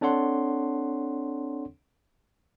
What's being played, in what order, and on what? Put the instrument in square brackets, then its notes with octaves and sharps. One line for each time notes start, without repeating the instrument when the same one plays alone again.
[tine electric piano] C4 D4 A4 C#5 F#5 C6